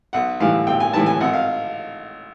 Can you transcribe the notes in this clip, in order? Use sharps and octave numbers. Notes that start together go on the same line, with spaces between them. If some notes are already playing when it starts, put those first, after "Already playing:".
B1 F#5
A2 E3 G3 F5
B1 G5
G#5
A2 E3 G3 A5
G#5
G#1 F#5
F5